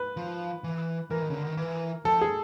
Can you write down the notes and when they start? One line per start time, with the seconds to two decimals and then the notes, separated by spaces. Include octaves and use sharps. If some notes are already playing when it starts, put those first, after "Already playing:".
Already playing: B4
0.17 F3
0.64 E3
1.10 E3 A#4
1.22 D#3
1.30 C#3
1.34 D3
1.46 D#3
1.57 E3
2.05 F3 A4
2.21 G#4